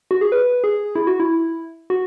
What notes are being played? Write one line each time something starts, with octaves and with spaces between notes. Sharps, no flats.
F#4
G#4
B4
G#4
E4
F#4
E4
F#4